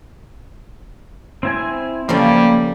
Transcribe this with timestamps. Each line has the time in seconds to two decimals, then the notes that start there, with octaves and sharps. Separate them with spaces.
1.43 C4 E4 G#5
2.09 C#3 F3 G3 A3 A#3